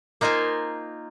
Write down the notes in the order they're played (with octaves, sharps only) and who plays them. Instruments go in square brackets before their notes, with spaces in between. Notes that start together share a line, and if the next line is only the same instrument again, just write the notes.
[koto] A#3 D#4 F4 C5 G#5